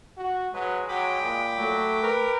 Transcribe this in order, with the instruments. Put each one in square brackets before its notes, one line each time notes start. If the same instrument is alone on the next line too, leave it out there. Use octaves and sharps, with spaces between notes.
[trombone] F#4
[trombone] F#3 [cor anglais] G#3 [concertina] B4
[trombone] F#3 [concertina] G5 B5 D6
[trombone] A#2
[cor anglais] F#3 [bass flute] A3
[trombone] A#4 [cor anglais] B4